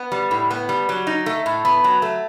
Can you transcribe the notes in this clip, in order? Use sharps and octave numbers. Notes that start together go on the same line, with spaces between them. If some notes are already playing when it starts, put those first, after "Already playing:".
Already playing: B3
G3
A2
B3
G3
F#3
D#4
A3
A2
B3
F#3
A3